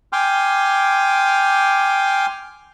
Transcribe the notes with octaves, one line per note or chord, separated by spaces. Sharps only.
G5 G#5 C6 D6 F6